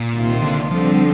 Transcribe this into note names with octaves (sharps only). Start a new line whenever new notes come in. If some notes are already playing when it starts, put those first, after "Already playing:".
Already playing: A#2
C2 C3 D#3 A#3 F4
D3
D3 F3 G3 C4